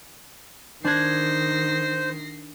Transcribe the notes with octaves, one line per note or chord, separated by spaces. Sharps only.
D#3 D4 C5 F#6 G#6 A#6 C7